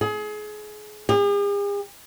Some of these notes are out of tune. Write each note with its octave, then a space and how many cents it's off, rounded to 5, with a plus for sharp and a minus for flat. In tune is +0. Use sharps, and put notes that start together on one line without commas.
G#4 +30
G#4 -45